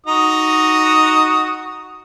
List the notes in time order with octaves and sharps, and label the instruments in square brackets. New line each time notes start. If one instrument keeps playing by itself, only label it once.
[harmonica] D#4 F#4 D#6